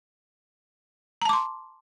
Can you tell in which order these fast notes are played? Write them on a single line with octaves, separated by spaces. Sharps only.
A#5 A5 D6 C6